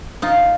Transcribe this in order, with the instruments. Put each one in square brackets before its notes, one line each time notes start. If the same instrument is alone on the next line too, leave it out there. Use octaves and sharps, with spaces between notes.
[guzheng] D#4 F4